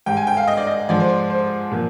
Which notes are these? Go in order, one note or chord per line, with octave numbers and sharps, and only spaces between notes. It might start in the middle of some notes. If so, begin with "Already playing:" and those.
G#2 G3 G5
G#5
G5
F5
D#5
D5
D#5
G#2 F3 G#3 D5
C5
D5
C5
A#2 F3